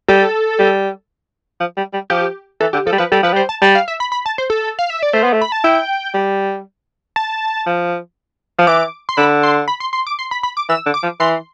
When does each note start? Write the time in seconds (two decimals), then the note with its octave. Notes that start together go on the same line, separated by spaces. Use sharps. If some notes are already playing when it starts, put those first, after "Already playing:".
0.08 G3 A4
0.59 G3
1.60 F3
1.77 G3
1.93 G3
2.10 F3 G4
2.61 E3 A4
2.73 D3 G4
2.86 F3 A4
2.93 G3
2.98 F3 B4
3.11 G3 A4
3.23 F3 B4
3.33 G3 C5
3.49 A5
3.62 G3 A5
3.75 F5
3.88 E5
4.00 B5
4.12 B5
4.26 A5
4.38 C5
4.50 A4
4.79 F5
4.90 E5
5.02 D5
5.13 A3 C5
5.24 B3
5.33 A3
5.41 B5
5.52 A5
5.64 E4 G5
6.14 G3
7.16 A5
7.66 F3
8.59 F3
8.67 E3 D6
9.09 C6
9.17 D3 B5
9.43 C6
9.68 B5
9.80 C6
9.93 C6
10.07 D6
10.19 C6
10.31 B5
10.43 B5
10.57 D6
10.69 E3 E6
10.86 D3
10.94 D6
11.03 F3
11.20 E3 C6